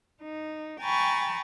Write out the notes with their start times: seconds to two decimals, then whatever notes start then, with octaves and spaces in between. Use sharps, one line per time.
0.23 D#4
0.82 G5 G#5 A#5 B5 C#6 A6